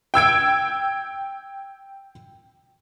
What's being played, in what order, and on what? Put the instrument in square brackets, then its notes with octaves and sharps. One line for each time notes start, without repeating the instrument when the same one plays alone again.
[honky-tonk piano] G5 E6 G#6 D7